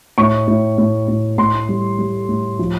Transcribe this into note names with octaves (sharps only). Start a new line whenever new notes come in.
A2 C#6
A2
A2
A2
A2 C6
G3
G3
A2
F3